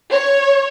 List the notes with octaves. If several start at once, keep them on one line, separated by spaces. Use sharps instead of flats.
C#5